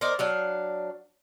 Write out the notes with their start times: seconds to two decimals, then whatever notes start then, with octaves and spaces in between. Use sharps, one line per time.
0.01 A#4 C5 D5 D#5
0.19 F#3 D4 F5